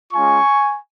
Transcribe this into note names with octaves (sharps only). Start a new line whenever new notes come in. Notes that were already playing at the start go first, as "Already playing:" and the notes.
G#3 C#4 F4 G#5 C#6